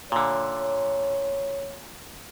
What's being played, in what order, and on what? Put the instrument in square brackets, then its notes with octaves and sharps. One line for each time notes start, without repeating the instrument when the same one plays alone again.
[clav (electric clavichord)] A#2 D3 [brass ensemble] C#5